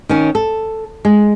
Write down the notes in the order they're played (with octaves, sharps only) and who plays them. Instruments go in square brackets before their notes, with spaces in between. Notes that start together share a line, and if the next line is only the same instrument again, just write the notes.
[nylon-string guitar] D#3 C#4
A4
G#3